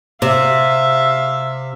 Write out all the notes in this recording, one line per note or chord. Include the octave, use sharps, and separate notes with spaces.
C3 E5 F5